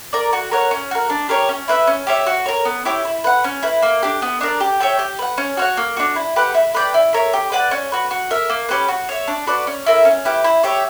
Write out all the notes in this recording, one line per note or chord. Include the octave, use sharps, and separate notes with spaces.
A#4 D5
F#4
A#4 C#5 F#5
C#4
F#4 A#4
D4
G4 A#4 C#5
C#4
E4 B4 E5
C#4
G4 C#5 E5
F#4
A#4 C#5
B3
E4 G4 C#5
E4
B4 F#5
C#4
E4 B4
A#3
D4 G4
B3
D4 A#4 D5
G4
C#5 E5 G5
G4
B4 F#5
C#4
F#4 C#5 F#5
A#3
D4 F#4
E4
G4 B4 F#5
E4
B4 D5 G5
E4
A#4 C#5 E5
G4
B4 D5 F#5
C#4
F#4 B4
F#4
A#4 E5
A#3
C#4 G4 B4
F#4
C#5 E5
D4
F#4 B4 D5
C#4
E4 A#4 E5
C#4
E4 G4 B4
E4
G4 C#5 E5